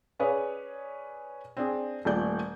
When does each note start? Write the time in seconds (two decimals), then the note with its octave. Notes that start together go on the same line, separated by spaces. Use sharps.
0.20 C#4 G#4 B4 C#5 D5
1.57 C4 D4 G#4
2.05 D#1 A#2 A3 D5 G6